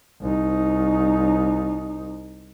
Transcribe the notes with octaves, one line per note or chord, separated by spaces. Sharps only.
C2 D#4